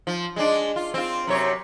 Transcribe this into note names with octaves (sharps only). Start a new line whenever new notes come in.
F3
G#3 D4
F4
C4 F4
F#2 C3 C#5